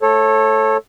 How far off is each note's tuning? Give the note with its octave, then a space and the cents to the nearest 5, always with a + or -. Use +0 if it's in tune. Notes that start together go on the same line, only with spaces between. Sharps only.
A3 +0 A4 +0 C#5 -25